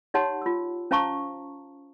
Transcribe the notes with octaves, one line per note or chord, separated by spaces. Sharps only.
D#4 G4 C#5 F#5 A5 C6
F4 E6
C#4 C5 F5 A5 A#5 C#6